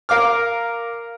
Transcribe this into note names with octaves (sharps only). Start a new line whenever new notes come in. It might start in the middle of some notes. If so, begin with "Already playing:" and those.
A#4 F5 D6 F6